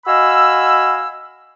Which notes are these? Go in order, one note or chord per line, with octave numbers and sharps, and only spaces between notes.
F#4 D#5 F5 G#5 B5 E6